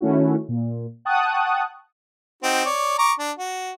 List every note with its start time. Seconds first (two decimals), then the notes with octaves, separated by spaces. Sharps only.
0.01 D#3 A3 C#4 E4 F#4
0.48 A#2
1.05 F#5 G5 A5 C#6 D#6 F#6
2.43 C4 D#4 F#4
2.65 C#5 D5
2.98 A#5 C#6 D6
3.19 D4
3.39 F#4